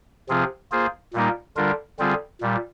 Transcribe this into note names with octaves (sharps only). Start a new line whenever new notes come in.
C3 F3 C4 F4 G#4
A#3 F4 G#4 C5
A#2 G3 A#3 D#4 A#4
D3 G3 D4 F4 A#4
D3 G3 C4 F4 G#4
A#2 G3